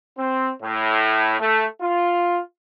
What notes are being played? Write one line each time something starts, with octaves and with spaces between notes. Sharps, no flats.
C4
A2
A3
F4